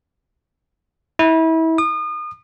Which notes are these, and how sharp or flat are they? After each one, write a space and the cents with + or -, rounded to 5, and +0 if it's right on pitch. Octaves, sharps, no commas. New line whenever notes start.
E4 -30
D#6 -35